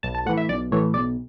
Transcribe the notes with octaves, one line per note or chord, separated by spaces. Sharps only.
B1 A5
A5
A2 E3 F#5
E5
B1 D5
A2 E3 C#5
B1 D5